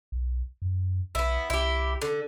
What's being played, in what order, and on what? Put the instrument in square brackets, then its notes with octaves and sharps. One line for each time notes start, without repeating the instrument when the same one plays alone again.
[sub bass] B1
F#2
[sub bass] B1 [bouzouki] B3 E4
[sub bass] C2 [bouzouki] E4 G4
[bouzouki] D3